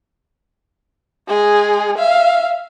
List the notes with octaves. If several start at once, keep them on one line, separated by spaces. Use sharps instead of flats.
G#3 G#4
E5 F5